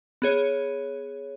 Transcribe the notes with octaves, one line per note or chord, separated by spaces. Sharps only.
B3 G#4 C#5